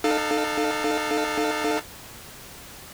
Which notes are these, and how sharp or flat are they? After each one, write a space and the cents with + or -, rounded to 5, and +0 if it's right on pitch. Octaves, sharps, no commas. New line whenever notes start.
D#4 -35 A4 +0 F5 +5